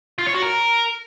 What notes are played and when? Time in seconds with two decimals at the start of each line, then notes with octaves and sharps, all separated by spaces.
0.19 F4
0.27 C#5
0.35 F#4
0.43 A#4